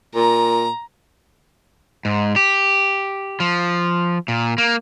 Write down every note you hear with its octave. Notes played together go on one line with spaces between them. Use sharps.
A#2 A#5
G#2
G4
F3
A#2
A#3